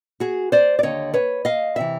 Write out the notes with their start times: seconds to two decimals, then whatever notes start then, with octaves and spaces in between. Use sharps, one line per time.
0.20 F#4 G#4
0.52 C5 D5
0.79 D5
0.83 D#2 D3 C#5 D#5
1.14 B4 C#5
1.45 D#5 F5
1.76 C3 E3 E5